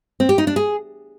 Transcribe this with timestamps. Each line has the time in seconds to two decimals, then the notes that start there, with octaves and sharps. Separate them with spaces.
0.20 C4
0.29 G4
0.38 D#4
0.47 D4
0.56 G#4